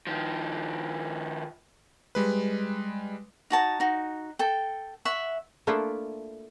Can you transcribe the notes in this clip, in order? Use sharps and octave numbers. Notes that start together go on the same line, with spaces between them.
D#3 F3
G3 G#3 B4
D#4 F#4 A5 A#5
D#4 F#4
A4 G5
E5 F#5 C#6
A3 A#3 D4 E4 F4 A4